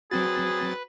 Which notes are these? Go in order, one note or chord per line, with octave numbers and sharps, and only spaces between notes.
F#3 C4 F#4 G#4 B4 A6